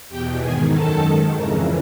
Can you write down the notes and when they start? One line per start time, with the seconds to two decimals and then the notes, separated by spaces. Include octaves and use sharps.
0.09 E2 B2 G4 G5
0.40 G#2 D#3 G#4 G#5
0.71 F#2 D#3 A4 A5
1.01 G#2 D#3
1.32 F2 C#3 E3 A#4 A#5